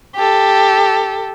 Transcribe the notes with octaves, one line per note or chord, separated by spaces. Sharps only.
G4 A4